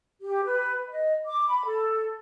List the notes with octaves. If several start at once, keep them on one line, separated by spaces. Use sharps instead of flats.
G4
B4
D#5
D6
B5
A4